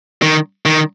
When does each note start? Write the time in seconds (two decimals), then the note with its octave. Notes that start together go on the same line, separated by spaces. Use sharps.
0.22 D#3
0.66 D#3